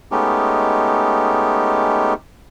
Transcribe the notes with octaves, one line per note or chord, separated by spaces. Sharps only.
G#3 A3 B3 C#4 D#4 G4